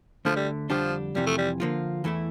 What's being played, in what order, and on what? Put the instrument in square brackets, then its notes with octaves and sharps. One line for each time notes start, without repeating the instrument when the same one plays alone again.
[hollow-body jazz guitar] D2 D3 A3 [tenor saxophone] F3
[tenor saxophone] G3
[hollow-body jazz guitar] F2 D3 G3 D4 G4 [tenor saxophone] F3
[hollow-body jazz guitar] F2 C3 E3 [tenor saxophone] G3
[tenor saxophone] A3
G3
[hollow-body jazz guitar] D3 F3 A#3 F4
E2 E3 A3 E4